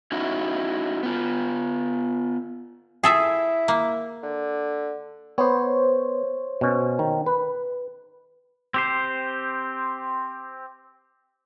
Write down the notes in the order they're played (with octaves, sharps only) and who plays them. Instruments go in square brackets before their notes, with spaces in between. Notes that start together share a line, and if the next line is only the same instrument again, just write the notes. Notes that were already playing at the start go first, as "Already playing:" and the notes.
[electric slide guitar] C#4 D#4 E4 F#4
B3 F4
[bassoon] E4 [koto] G#4 A4 E5
[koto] A#3
[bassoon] D3
[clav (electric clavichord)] B3 [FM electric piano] C5 C#5
[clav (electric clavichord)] B2 C#4
D#3
B4
[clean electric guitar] C4 G4 C5